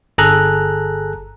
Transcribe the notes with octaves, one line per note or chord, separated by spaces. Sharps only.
G1 G#4 A4 A#5 F#6